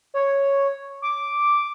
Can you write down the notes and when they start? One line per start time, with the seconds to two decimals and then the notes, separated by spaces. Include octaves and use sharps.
0.14 C#5
1.02 D6